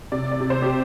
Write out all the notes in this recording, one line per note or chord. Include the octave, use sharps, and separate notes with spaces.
C3 D5
D5
C3
C5
G4